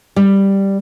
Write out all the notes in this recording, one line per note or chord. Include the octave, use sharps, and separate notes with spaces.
G3